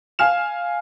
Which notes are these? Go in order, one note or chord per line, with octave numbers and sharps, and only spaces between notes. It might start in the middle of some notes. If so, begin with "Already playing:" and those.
F5 G#5 F6 E7